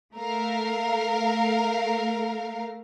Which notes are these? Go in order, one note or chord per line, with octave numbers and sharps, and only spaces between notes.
A3 A#4 F5